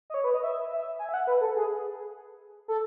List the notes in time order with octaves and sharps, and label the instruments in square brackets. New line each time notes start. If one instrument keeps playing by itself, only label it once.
[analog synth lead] D#5
C#5
B4
D#5
E5
E5
G#5
E5
F#5
B4
A4
G#4
A4